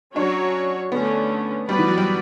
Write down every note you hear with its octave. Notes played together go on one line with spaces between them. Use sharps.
F#3 C#4 D4 F#4 C#5
D3 A3 B3 C#4
G3 B3 F#4 B4 D5
E3
F#3
G3